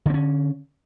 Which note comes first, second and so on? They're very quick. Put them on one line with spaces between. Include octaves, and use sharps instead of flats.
D3 C4 C#4